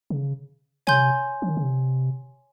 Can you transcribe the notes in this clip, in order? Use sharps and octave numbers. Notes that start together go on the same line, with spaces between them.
C#3
C3 C#5 G#5 C6 G6
F3
D#3
C#3
C3